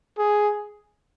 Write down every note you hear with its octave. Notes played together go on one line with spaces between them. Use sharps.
G#4